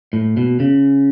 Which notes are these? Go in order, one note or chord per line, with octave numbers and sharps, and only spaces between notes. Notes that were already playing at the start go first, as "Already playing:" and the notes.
A2
B2
C#3